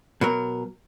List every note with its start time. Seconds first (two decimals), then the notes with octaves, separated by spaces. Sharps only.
0.21 B2 F#3 A#4